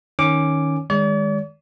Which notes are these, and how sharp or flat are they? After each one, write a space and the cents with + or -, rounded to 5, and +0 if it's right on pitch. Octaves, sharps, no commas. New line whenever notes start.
D#3 +0 C#4 +0 D6 +0
D#3 +0 G#3 -15 D5 -45